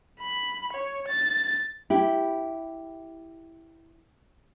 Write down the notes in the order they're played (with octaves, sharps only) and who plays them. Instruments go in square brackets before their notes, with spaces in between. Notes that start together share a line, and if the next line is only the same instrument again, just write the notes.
[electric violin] B5
C#5
A6
[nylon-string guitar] E4 G4